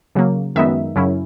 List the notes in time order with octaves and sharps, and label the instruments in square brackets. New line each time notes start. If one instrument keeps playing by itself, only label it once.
[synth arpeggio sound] C#3 F#3 A#3
F#2 D#3 G#3 B3 D#4 E5
F#2 C#3 F#3 C#4 E4